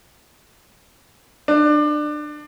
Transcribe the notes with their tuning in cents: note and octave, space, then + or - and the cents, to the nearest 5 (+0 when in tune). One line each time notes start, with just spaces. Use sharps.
D4 +25